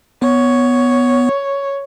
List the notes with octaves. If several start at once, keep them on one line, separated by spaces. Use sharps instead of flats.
B3 C#5